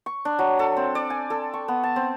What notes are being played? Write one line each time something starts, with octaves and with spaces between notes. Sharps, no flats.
C#6
D4
F#3
A4
C4
D5
G#5
A4
C#6
B3
A5
C4